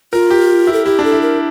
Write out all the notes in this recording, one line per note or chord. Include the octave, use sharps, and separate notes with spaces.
F4 A#4
G4
E4
A4
E4 G4
D4
A4
E4
A#4